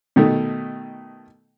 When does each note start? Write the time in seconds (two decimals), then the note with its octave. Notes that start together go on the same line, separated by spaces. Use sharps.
0.16 B2 D#3 A3